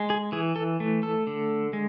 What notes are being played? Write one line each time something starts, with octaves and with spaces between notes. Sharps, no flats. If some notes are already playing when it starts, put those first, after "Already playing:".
Already playing: G#3
G#4
E3 G#4
A4
A3
A4
D3
G#3